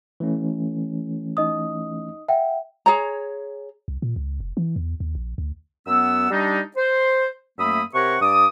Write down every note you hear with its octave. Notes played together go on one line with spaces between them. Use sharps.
E3 A3 C#4
D#4 D#5 D#6
E5 F#5 G5
G#4 C#5 A#5
C2
A#2
C#2
F1
E3
E2
D#2
A#1
D2
F#2 B3 F#5 E6
G3 D4 D#4
C5
F#2 A3 A#3 E5 B5 D#6
C3 G4 A#4 C#5 F#5 C#6
G2 D5 D6 D#6